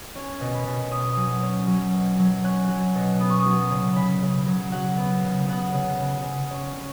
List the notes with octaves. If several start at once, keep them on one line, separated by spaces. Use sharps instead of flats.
C#4 G#5
B2
B5
B2
C#4 D#6
F#3
C#4
F#3
B2
F#3
C#4 F#6
F#3
B2
B3 D#6
C#6
D#6
F#3
C#3
C#3 B5
C#3
F#3
F#3 F#5
B3
C#3
B3 F#5
C#3
C#3
C#3
C#4
C#4